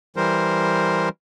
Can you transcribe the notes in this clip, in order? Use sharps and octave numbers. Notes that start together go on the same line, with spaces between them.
E3 G3 A#4 C5